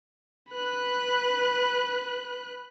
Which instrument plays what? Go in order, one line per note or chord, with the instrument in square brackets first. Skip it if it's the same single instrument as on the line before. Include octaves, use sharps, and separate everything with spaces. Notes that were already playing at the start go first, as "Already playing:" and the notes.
[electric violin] B4 F#6